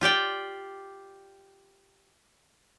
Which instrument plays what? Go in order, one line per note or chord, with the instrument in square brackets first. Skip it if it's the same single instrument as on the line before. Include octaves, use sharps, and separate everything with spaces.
[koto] F4 G4 D5 G5